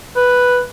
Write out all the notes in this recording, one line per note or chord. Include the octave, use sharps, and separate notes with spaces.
B4